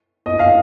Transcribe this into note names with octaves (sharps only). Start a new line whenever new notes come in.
D#5
F5